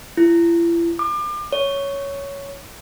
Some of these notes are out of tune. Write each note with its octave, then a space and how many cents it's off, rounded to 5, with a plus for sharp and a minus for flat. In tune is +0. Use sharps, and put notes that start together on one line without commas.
E4 +40
D6 +35
C#5 +5